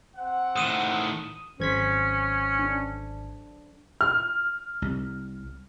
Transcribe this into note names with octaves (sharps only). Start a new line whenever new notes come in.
C4 F#5
A2 D#3 D#6 D#7 E7
G#1 F#3 C#4 C5 G#6 B6
D4
F6
C2